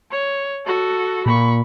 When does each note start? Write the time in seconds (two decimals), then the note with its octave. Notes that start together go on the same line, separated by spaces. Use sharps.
0.11 C#5
0.66 F#4 A4
1.26 A#2 B5 C#6